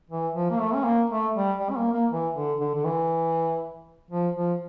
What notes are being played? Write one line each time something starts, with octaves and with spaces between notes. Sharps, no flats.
E3
F3
A#3
A3
C#4
A#3
A3
G3
G3
C#4
A#3
A#3
E3
D3
D3
D3
E3
F3
F3